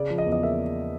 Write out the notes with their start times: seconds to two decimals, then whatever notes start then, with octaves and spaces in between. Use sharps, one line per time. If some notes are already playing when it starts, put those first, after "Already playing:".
Already playing: C#3 D5
0.10 F3
0.18 D#5
0.26 E2
0.32 D#5
0.43 A#3 E5